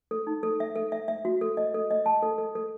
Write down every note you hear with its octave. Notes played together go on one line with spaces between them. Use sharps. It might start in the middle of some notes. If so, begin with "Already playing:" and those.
A4
D#4
A4
E5
A4
E5
E5
F#4
A4
D#5
A4
D#5
A5
A4
A4
A4